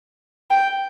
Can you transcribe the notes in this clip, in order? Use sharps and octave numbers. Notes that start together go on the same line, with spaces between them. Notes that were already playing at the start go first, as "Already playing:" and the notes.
G5